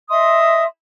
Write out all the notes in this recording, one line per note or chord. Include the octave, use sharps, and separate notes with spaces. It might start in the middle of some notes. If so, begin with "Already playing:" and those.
D#5 E5 C6 D#6